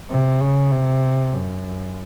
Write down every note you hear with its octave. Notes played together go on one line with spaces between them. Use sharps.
C3
C#3
C3
F#2